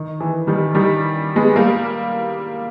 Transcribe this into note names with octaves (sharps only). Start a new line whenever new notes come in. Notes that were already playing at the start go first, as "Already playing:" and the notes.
Already playing: D#3
E3
D#3 G3
D#3 G3
G#3 B3
G3 A#3